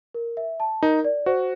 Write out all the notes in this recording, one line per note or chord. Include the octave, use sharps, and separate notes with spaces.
A#4
E5
A5
D#4 A#4
D5
F#4 C5